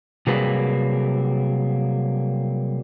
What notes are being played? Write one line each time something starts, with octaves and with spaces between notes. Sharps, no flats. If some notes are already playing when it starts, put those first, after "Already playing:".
C3 F#3 G3 A#3 G#4 B4